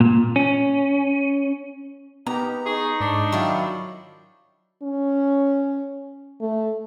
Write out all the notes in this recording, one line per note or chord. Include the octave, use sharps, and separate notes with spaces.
A#2
C#4
B3 D#4 G4 A#4 A#5
D#4 G#4 C#6
G#2 D4
D#3 F#3 E4 F4
C#4
A3